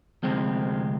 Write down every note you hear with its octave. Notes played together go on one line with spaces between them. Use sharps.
D2 C3 F3 G#3 C4